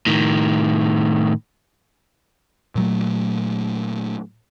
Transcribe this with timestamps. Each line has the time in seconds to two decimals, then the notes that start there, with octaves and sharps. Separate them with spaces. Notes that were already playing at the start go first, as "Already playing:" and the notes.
0.07 A2 D#3
2.75 A#2 F#3 A3